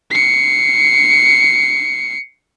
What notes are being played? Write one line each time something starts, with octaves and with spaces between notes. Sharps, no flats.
C7 C#7